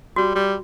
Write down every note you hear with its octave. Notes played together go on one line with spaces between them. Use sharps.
G3 F#4
G3